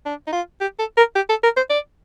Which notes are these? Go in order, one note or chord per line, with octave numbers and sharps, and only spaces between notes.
D4
D#4
F4
G4
A4
A#4
G4
A4
A#4
C5
D5